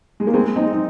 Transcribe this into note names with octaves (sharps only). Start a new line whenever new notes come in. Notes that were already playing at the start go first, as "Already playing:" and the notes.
G#3
A#3
G#3 C4
C4 D#4
D#4